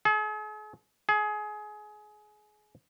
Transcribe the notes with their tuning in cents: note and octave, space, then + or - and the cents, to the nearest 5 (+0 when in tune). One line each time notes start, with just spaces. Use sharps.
G#4 +45
G#4 +25